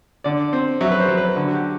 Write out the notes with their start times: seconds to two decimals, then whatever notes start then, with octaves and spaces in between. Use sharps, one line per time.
0.24 D3 D5
0.53 C4
0.81 F#3 E5
0.91 B4
1.00 C5
1.08 F#3
1.17 B4
1.36 D3
1.47 F#4
1.54 G4